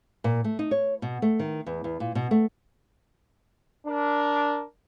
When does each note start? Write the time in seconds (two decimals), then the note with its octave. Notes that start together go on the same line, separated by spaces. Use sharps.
0.24 A#2
0.44 A3
0.59 D#4
0.71 C#5
1.02 B2
1.22 A3
1.40 D#3
1.66 E2
1.84 E2
2.00 A#2
2.15 B2
2.31 A3
3.86 D4 A#4